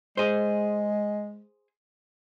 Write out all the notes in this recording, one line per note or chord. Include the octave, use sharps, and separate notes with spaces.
G#3 G#4 C5